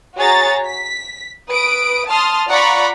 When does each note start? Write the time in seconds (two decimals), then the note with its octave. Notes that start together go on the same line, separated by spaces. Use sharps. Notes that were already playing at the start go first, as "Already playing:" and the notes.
0.17 F#4 G#4 C#5 A#5 A6
0.64 B6
1.51 B4 D#6 D7
2.08 A5 C6 D#6 F6
2.49 F4 D5 F#5 A#5 B5 C#6